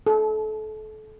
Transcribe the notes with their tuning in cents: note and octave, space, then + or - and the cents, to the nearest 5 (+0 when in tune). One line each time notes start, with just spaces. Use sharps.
A4 -30